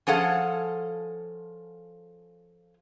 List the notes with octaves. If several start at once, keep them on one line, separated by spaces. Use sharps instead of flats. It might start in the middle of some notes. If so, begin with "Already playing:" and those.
F3 C#4 G#4 A4 F5 F#5